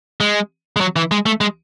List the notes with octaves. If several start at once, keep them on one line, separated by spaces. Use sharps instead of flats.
G#3
G#3
F#3
E3
G#3
A3
G#3